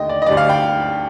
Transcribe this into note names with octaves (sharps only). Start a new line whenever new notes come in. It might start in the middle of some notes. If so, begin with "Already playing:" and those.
Already playing: D#2 D3 A3 D4 D#5 G5
D5
D#5
D2 D3 G3 D5
F5
G5